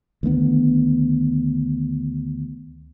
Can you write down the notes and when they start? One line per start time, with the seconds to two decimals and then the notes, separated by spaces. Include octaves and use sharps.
0.23 D2 D#3 A#3 B3